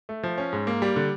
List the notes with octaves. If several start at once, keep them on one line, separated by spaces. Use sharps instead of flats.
A3
F3
C#4
G#2
A#3
G3
D3